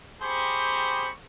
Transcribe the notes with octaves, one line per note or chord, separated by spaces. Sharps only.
C4 G4 G#4 C5 B5 C#6